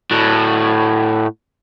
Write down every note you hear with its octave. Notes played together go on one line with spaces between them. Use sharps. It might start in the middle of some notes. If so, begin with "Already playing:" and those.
A2 F#4